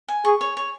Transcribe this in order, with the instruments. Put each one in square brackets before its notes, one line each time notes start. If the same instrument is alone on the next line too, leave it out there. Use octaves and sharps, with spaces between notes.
[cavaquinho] G#5
[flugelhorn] G#4 [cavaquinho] C#6
[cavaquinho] C#5
C#5